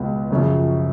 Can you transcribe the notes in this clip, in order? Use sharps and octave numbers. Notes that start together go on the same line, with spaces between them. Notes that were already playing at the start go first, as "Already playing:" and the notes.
Already playing: C#2 B2 G#3 B3
F#2 C#3 F3